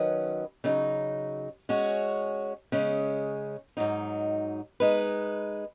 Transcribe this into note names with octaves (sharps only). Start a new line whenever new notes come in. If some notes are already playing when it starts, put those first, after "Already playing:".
Already playing: D#3 F#3 C#4 B4 D#5
C#3 F#3 D#4
G#3 C#4 F#4 C#5
C#3 G#3 C#4
G#2 F#3 D#4
G#3 D#4 B4